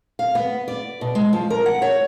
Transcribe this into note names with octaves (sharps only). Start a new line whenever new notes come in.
F5
B3
D5
B2
G#3
F3
A#4
F#5
C#5